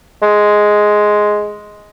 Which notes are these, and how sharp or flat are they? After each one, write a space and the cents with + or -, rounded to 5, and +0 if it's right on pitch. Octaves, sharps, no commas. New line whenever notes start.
G#3 +5